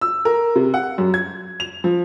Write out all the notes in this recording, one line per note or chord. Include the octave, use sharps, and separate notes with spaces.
E6
A#4
C3
F#5
F#2
G#6
F7
F3